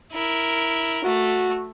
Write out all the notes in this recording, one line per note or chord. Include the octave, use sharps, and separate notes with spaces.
E4 A#4
A3 F#4